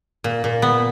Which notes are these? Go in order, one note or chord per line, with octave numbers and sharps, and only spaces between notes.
A#2
A#2
B3